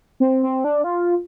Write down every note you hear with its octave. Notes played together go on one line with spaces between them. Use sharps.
C4
C4
D4
F4